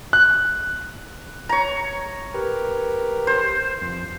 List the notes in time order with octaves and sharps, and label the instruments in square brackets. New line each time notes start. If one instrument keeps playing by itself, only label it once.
[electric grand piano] F#6
[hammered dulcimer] C#5 A#5
[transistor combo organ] G4 A#4 B4
[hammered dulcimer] C5
[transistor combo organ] F2